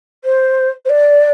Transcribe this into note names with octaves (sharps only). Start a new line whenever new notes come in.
C5
C5
D5